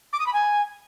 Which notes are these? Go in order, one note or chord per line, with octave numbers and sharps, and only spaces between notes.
D6
D#6
B5
G#5